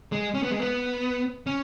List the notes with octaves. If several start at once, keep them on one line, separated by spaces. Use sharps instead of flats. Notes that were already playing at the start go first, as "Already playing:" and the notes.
G#3
C#4
B3
G#3
B3
C#4